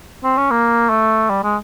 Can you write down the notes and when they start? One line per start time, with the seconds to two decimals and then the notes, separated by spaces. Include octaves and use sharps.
0.24 C4
0.37 C#4
0.51 A#3
0.90 A3
1.30 G3
1.43 G#3